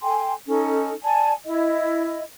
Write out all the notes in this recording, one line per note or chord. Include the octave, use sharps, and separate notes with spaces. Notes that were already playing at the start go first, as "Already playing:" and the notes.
A4 G5 G#5 C6
C#4 D#4 A4
D5 G#5 A5
E4 D#5